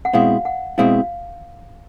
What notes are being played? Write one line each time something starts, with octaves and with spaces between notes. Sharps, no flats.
F#5
B2 G#3 C4 E4 F5
F#5
B2 G#3 C4 E4 F5